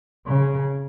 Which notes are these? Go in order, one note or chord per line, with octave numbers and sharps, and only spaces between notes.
C#3